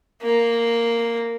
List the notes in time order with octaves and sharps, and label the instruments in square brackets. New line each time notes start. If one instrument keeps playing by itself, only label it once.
[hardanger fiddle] A#3